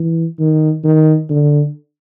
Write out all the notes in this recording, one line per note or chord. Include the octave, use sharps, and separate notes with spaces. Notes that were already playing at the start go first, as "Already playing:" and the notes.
Already playing: E3
D#3
D#3
D3